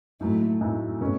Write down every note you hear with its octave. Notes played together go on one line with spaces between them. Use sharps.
B1 A2 F#3 A3
B1 A2 F#3
B2 A3 C#4